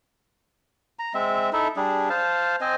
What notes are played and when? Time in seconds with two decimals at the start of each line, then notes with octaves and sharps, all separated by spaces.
0.99 A#5
1.14 G#3 C4 E5
1.53 D#4 E4 A4 E5
1.77 G3 D4 G#4
2.10 C5 F5 A5
2.61 C4 C5 D#5 G#5